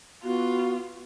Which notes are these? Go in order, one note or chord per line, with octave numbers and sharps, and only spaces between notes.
B3 F4 F#4